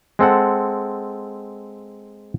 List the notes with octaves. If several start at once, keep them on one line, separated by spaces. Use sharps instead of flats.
G#3 C4 A4 F#5